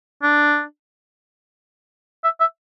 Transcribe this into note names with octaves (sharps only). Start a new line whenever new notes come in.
D4
E5
E5